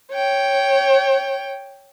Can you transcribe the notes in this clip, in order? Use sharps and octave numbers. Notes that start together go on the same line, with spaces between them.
C#5 G5